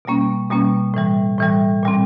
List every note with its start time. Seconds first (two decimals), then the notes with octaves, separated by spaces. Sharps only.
0.05 B2 G3 A#3 C#4
0.50 B2 G3 A#3 C#4
0.94 A2 E3 G3
1.39 A2 E3 G3
1.83 A#2 G3 C4